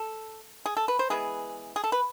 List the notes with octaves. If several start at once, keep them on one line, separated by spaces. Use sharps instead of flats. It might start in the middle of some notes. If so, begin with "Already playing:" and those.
Already playing: A4
G#4
A4
B4
C5
E3 G#3 B3 G#4
G#4
A4
B4